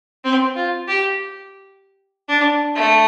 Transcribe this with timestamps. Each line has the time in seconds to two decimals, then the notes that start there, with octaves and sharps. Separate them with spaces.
0.24 C4
0.56 F4
0.88 G4
2.28 D4
2.75 A3